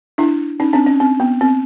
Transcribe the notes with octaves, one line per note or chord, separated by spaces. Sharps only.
D4 E4
C#4 D#4
C4 D4
C#4
C4
B3
C4